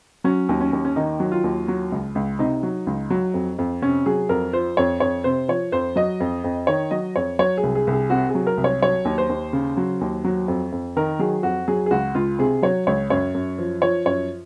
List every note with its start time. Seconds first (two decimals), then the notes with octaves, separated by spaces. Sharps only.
0.24 F#3 C#4
0.49 D#2
0.61 C#4
0.73 D#2
0.85 C#4
0.96 D#3 D#4
1.20 F#3
1.32 F4
1.44 D#2
1.68 F#3
1.92 C#2
2.15 C#2
2.39 C3 D#4
2.63 F#3
2.87 C#2
3.10 F#3
3.34 F2
3.59 F2
3.82 C3 C#4
4.06 F#3 G#4
4.29 F2 A#4
4.53 F3 C5
4.77 F2 C#5
5.00 F2 C#5
5.24 C3 C5
5.48 F3 C#5
5.72 F2 C5
5.96 F#3 D#5
6.20 F2
6.44 F2
6.67 D#3 C#5
6.91 F#3 D#5
7.16 F2 C#5
7.39 F#3 C#5
7.57 G#4
7.63 C2
7.75 G#4
7.87 C2
7.93 G#4
8.10 C3 F#4
8.29 G#4
8.35 F#3
8.47 A#4
8.57 C2
8.64 C#5
8.82 F#3 C#5
9.05 D#2
9.18 C5
9.29 D#2
9.53 C#3
9.77 F#3
10.01 D#2
10.25 F#3
10.48 F2
10.72 F2
10.97 D#3 A#4
11.19 F#3 G#4
11.43 F2 F#4
11.68 F#3 G#4
11.86 G#4
11.91 C#2 F#4
12.15 C#2 F4
12.39 C3 G#4
12.63 F#3 C#5
12.87 C#2 C#5
13.10 F#2 C#5
13.35 F#2
13.58 F3
13.82 F3 C#5
14.05 F#2 C#5